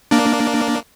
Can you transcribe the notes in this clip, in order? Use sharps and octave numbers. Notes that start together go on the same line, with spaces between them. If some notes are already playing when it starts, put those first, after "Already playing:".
A#3 D4